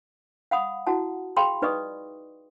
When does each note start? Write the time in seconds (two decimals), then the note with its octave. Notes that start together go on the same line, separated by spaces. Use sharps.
0.51 F5 F#5 B5 D#6
0.87 E4 F#4 F#5 A5
1.37 G#4 F5 G5 B5 C6
1.62 D#4 B4 D5 D#5 C#6 D#6